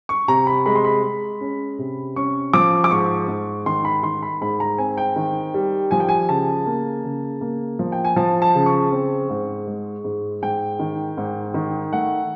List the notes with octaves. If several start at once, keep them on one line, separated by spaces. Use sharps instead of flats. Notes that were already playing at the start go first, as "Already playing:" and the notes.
C#6
C3 A#5
B5
G#3 B5
C6
B5
G#3
C#4
C3
C#4 C#6
F3 D6
D6
G#2 C#6
G#2
D#3 C6
B5
D#3 C6
B5
G#2 B5
A#5
C4 G#5
G5
D#3
G3
F3 G#5
G5
G#5
C#3 A5
A#3
C#3
A#3
F3
G5
G#5
F3 A5
A5
C#3
C#6
C4
G#2
G#3
G#2
G#2 G5
D#3
G#2
D#3
A3 F#5